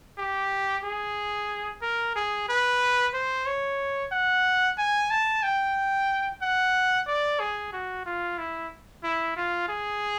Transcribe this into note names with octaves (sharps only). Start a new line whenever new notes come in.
G4
G#4
A#4
G#4
B4
C5
C#5
F#5
G#5
A5
G5
F#5
D5
G#4
F#4
F4
E4
E4
F4
G#4